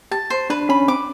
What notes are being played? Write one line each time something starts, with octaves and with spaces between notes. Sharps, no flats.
G4 A5
C5
D4 B4
C#4 B5
C4 D6